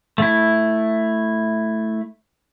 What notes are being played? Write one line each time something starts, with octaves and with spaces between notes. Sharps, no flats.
A3 E4